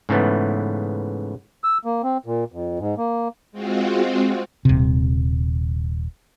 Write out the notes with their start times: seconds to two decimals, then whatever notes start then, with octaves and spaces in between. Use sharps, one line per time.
0.09 G#2 C#3 E3 A3 B3
1.64 E6
1.85 A#3
2.04 C4
2.26 A#2
2.52 F2
2.79 G#2
2.98 A#3
3.52 G#3 C4 F4 F#4
4.65 D#1 C3